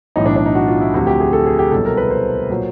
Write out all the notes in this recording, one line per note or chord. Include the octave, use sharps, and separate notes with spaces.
B1 A2 E3 D#4
D4
D4
D#4
F#4
F4
E4
D2 C3 F3 F#4
G4
G#4
A4
G#4
G4
C2 B2 F#3 A4
A#4
B4
C5
A#2 F#3